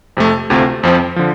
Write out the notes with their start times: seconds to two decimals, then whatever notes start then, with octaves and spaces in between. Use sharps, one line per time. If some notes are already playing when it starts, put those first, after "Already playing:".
0.17 F2 C3 A3
0.50 D2 C3 A3 C4 F4
0.83 F2 F3 C4
1.16 D3 F3